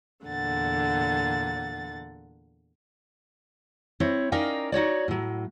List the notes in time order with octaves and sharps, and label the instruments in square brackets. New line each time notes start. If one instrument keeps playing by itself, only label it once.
[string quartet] E2 A#2 D3 F#5 A6
[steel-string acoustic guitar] C4 E4 C#5
C#4 D#4 A#4 D5 F5 G5
D#4 F#4 C#5 D5
A2 F#3